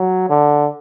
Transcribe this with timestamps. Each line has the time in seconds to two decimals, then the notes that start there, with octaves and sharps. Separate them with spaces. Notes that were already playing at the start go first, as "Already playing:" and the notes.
Already playing: F#3
0.29 D3